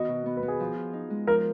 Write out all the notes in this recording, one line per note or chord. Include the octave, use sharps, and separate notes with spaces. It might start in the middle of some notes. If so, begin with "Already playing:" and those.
Already playing: D#3 B3 F#4 D#5
B2
B3
B4
B3
G#4
F3
F4
D#4
G#3
F3 A#4